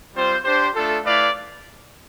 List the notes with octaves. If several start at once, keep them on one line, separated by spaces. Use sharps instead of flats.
G3 C4 F4 C5
D4 G4 C5
A3 D4 F4 A4
A3 E4 B4 D5 F5